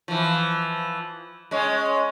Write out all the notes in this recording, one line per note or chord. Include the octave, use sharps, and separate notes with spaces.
E3 F3
G#3 C#4